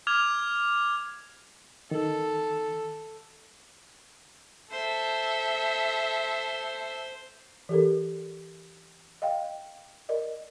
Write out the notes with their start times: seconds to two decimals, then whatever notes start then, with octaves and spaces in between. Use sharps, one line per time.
0.07 D6 F6 G#6 F7
1.91 D#3 A4
4.71 A4 C5 E5
7.69 E3 G4 A4 A#4
9.22 D#5 F5 G5
10.09 A#4 D5 D#5